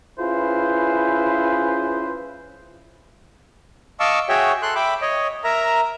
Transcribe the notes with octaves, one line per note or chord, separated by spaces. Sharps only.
C#4 E4 F4 G#4 B4 C5
D#5 F5 A5 C#6 D6 E6
F#4 G#4 C#5 E5 G5
A4 C6 F#6
E5 G5 B5 D6
C#5 D#5
A#4 E5 A#5